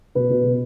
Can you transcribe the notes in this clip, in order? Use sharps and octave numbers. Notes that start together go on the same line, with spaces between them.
B2 B4
B2
B2